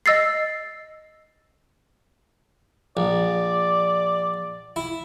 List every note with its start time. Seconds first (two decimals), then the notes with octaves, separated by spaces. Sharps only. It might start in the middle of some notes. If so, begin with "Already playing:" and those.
0.06 D#5 E6 A6 C7
2.97 A#1 D5
4.76 E4